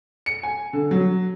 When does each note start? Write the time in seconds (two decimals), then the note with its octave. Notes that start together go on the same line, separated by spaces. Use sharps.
0.26 C#7
0.43 G#5
0.73 D3
0.91 F#3